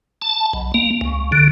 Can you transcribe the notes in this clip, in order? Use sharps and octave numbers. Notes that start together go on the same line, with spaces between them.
A5
B1
A#3
C#2
D3